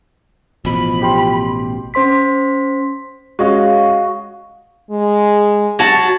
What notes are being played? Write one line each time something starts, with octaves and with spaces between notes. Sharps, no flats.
A1 B2 F3 B5
G4 G5 C6
C#4 C5 C6 B6
G#3 C#4 F#4 D#5 F5
G#3
F#3 F#4 A5